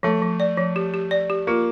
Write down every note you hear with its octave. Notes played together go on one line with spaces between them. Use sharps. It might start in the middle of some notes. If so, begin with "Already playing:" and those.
F3 A3
F3
D5
F3
G4
G4
D5
G4
A#3 F4